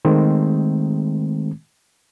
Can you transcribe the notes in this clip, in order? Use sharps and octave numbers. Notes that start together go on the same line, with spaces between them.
D#3 G#3 A3 C4